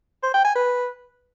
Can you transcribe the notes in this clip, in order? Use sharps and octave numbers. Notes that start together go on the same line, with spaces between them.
C5
G5
G#5
B4